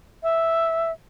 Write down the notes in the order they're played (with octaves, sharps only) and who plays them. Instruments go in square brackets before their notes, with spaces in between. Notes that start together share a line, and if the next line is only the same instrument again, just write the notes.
[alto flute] E5